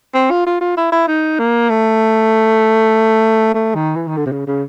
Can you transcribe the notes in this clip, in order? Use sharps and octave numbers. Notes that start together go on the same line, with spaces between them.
C4
F4
F4
F4
E4
E4
D#4
A#3
A3
A3
D#3
E3
D#3
D3
C3
C#3
C#3